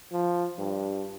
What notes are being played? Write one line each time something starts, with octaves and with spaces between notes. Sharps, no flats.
F3
G2